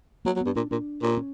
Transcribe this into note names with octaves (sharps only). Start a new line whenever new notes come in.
F#3 A#3
F#3
G2 B3
A#2 D4
A#2 D4
A#2
C#4